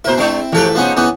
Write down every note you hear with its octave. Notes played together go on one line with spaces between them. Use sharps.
B2 E4 A#4 C5
G#3 C4 D4 E4
A1 E3 F3 G4 A4 B4
G#2 F3 B3 C#4 D#4
E3 B3 C#4